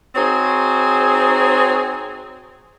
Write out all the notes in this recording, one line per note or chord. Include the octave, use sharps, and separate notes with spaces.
C4 D#4 F#4 G#4 C5 C#5